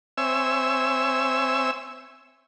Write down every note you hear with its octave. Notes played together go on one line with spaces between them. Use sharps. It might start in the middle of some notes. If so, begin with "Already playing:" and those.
C4 C#5 E5 G#5 E6